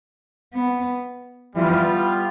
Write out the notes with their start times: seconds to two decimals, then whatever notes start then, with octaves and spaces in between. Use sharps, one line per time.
0.54 B3
1.55 E3 G3 B3 F4